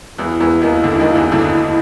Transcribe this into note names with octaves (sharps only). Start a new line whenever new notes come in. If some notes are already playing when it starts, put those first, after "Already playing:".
E2 E3 E4
E2 E3
D#2 D#3
D2 D3
D#2 D#3
E2 E3
D2 D3